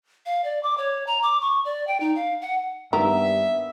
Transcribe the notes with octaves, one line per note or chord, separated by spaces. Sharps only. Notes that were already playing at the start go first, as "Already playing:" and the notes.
F5
D5
D6
C#5
A#5
D6
C#6
D5
G5
D#4
F5
F#5
G2 D#3 A#3 B3 G4 E5 A#5